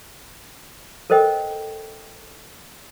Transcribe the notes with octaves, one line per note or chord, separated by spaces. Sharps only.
A4 A#4 C5 D#5 G5